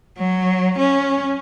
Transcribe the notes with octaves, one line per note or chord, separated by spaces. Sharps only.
F#3
C#4